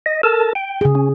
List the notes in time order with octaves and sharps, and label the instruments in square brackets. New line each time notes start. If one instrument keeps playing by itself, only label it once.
[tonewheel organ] D#5
A4 A#4 A5
G5
[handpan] C#3 G#4
[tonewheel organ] C#4